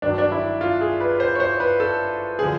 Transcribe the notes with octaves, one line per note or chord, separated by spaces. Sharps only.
G#1 G2 D#3 F#3 D4
D4
E4
F4
G#4
B4
C5
C#5
C5
B4
A4
D3 F3 G#4